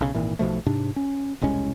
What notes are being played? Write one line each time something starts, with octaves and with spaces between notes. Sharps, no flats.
B1 C#3
G#1 A#2 E3
B1 B2 F3 A3
G#2 C3 D4
C#4
E1 C2 G#3 C#4